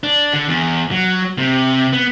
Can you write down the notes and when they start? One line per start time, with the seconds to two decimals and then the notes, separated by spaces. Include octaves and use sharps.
0.03 D4
0.33 D3
0.48 E2
0.91 F#3
1.38 C3
1.93 B3